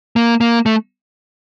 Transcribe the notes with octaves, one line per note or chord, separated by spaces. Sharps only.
A#3
A#3
A3